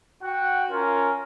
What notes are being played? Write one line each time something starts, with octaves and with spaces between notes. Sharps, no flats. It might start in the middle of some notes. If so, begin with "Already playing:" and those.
F#4 F#5 G5
C#4 F4 A#4